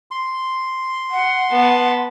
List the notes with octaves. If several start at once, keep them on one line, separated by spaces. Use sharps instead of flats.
C6
F#5
B3 A5